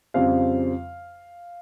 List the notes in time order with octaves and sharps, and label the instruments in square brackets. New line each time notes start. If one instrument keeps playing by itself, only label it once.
[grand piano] F2 C#3 G3 C4 F4 F5